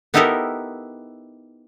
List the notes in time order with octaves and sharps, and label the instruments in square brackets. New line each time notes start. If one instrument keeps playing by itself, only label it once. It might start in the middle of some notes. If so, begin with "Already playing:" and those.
[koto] B3 D#4 E4 G4 A4 A#4